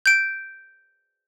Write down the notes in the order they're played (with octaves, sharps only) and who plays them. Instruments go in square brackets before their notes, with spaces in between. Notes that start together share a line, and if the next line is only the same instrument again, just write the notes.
[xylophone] G6 D7